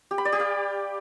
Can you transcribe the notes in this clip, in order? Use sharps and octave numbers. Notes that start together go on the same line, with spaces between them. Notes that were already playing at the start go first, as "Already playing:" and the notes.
G4
B5
D5
G4
F5